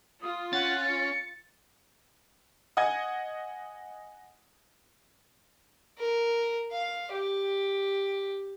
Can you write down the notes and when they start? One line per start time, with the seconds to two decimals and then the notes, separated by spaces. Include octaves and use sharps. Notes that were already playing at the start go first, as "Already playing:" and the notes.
0.22 F4 D#6
0.53 C#4 F#5 A6
0.87 C#7
2.77 D#5 F#5 G#5 G#6
5.98 A#4
6.72 F5
7.12 G4